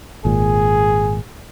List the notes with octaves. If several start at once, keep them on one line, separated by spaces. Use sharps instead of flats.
G#1 A#2 G#4